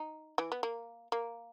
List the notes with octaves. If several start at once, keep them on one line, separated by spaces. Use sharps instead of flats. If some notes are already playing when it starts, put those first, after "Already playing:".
Already playing: D#4
E3
B3
A#3
A#3